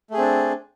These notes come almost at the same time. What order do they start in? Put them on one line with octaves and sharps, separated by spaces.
A3 G#4 C4 D4